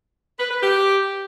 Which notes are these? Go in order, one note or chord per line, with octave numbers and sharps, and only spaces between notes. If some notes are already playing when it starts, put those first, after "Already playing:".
B4
B4
G4